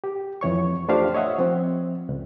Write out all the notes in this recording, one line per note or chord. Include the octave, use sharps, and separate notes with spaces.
G4
F2 E3 C#5 C#6
A3 D4 F4 G4 C5 F5
C#5 D#5 E5 F#5
F3 C4
C#2